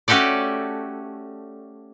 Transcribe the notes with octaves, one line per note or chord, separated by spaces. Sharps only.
A3 C#4 F#4 G4 A4 D5